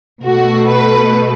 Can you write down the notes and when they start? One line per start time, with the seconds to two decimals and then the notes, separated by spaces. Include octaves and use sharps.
0.24 B2 A3 F#4
0.67 B4